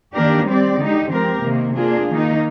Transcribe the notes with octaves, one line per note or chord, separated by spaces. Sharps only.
D#3 A#3 D4 G4 A#4
G3 C4 G4 D5
D3 G#3 D#4 G4
F3 C4 G4 A#4
C3 D#3 A#3
A#3 D4 F4 G#4
D#3 A#3 D#4